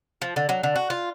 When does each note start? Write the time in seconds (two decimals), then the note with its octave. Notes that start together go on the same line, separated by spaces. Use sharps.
0.22 F3
0.36 D3
0.49 F#3
0.63 D3
0.76 F#4
0.90 F4